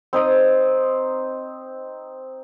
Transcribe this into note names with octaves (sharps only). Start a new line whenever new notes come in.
C4 D#4 C5 D#6